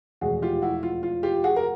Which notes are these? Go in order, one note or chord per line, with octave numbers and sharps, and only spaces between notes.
F1 E2 B2 G#3 B3 F#4 G#4
F4 G4
E4 F#4
F4
F4
F4 G4
F#4 G#4
A#4